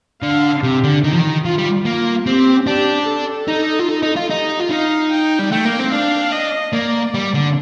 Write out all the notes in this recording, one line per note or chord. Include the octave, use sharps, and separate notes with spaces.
D3 F5
C3 G4
D3
D#3 D#4
F3
D#3
F3 F4
G3
A#3 F4
C4 G4
D4 G4
A4
D#4
F4
D#4
D#4
F4
D#4 G4
F4
D#4 F5
G5
G3
A3 G5
A#3
C4
D4 F5
D#5
A#3 D5
G3
D3